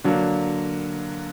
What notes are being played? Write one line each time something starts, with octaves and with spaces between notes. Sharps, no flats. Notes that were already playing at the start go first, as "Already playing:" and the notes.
D3 F#3 A#3